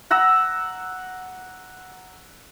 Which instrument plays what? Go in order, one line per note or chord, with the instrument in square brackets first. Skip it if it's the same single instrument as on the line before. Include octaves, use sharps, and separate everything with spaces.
[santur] F#5 A#5 D6 E6